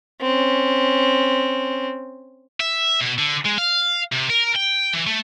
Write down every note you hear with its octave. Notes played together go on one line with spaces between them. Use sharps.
C4 C#4
E5
B2
D3
G#3
F5
C3
A#4
G5
E3
A3